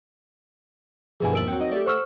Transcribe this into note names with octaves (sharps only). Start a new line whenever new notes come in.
G2 B2 D3 E3 F3 G3 G#4 G#5
D#2 A#4 E5 A5 D7 F#7
F#3 C4 F#5 G5
D#4 D#5
A3 G4 A4 D5
C5 F#5 C#6 E6 F6